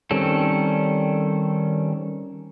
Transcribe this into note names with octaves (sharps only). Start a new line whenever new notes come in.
D#3 G3 C4 C#4 A4